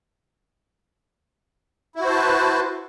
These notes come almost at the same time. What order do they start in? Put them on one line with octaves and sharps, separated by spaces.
E4 F#4 C5 A5 B4